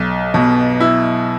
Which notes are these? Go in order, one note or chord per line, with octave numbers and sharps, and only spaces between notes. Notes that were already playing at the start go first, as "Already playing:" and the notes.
Already playing: B1
B2
E4